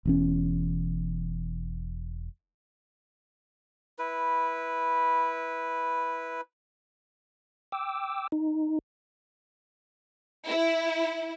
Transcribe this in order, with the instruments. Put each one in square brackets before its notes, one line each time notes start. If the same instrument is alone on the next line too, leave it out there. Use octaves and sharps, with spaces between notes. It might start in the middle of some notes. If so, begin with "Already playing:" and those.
[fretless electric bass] E1 E2 C#4
[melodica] E4 B4
[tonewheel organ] G5 D6 E6
D#4
[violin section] E4